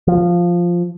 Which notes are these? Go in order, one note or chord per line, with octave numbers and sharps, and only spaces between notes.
F3